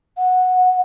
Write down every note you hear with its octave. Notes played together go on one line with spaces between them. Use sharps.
F#5